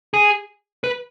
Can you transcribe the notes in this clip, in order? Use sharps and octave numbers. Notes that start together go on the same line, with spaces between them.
G#4
B4